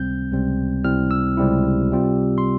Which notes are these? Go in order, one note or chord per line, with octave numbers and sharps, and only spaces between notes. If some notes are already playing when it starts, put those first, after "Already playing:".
Already playing: C#2 C3 G3 C4 G6
C#2 C3 G3 C4
C#2 C3 G3 C4 E4 F6
E6
C#2 C3 G3 C4 E4
C3 G3 C4 F4
C6